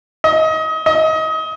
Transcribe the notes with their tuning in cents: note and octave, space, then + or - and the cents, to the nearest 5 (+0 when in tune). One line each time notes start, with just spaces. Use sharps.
D#5 +30
D#5 +30